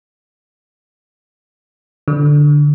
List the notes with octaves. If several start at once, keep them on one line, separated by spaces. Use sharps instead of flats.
D3